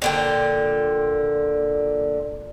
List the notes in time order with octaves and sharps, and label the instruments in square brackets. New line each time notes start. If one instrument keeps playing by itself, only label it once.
[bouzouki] A#2 D3 G5